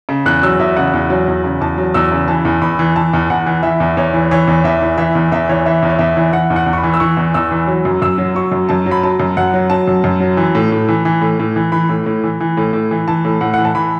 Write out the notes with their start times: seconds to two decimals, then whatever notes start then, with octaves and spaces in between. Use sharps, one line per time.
0.09 C#3
0.26 E2 F#6
0.43 F#3 E6
0.59 E2 E5
0.76 C#3 F#5
0.94 E2
1.10 F#3
1.28 E2
1.44 C#3
1.61 E2 A5
1.78 F#3
1.94 E2 E6
2.12 C#3
2.28 E3 A5
2.45 E2
2.62 E2 B5
2.79 E3
2.96 E3 A5
3.13 E2
3.30 E2 F#5
3.46 E3
3.63 E3 E5
3.80 E2
3.97 E2 C#5
4.14 E3
4.31 E3 C#5
4.47 E2
4.64 E2 E5
4.82 E3
4.98 E3 E5
5.15 E2
5.32 E2 E5
5.49 E3 C#5
5.66 E3 E5
5.83 E2
5.90 C#5
5.99 E2 E5
6.17 E3
6.32 E3 F#5
6.50 E2
6.56 F#5
6.66 E2
6.73 C#6
6.78 B5
6.83 E3
6.94 E6
7.00 E3 C#6
7.17 E2
7.34 E2 E6
7.51 E3
7.67 F#3
7.85 F#2
8.02 F#2 E6
8.18 F#3
8.35 F#3 C#6
8.52 F#2
8.69 F#2 A5
8.86 F#3
8.91 B5
9.03 F#3 A5
9.20 F#2
9.37 F#2 F#5
9.54 F#3
9.70 F#3 A5
9.88 F#2
10.04 F#2
10.20 F#3
10.37 E3
10.55 A2
10.72 A2
10.89 E3
11.05 E3
11.21 A2
11.39 A2
11.56 E3
11.72 E3 B5
11.89 A2
12.06 A2
12.24 E3
12.40 E3
12.57 A2
12.73 A2
12.91 E3
13.08 E3 A5
13.25 A2
13.41 A2 F#5
13.54 E3 F#5
13.65 A5
13.75 E3 B5